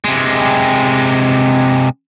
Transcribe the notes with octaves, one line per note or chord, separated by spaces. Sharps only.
C3 G#3